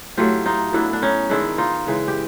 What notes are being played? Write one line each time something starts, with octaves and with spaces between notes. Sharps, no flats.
A2 F#3 A3 F4 G4
D#4 F4
A2 F#3 B3 D4 E4
D4
C#4 D#4
G#2 D#3 G#3 D4 E4
D#4 F4
C#3 E3 G#3
G4